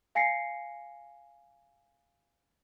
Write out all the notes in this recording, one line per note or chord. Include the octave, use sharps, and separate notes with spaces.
F5 G#5 A#6 C7 C#7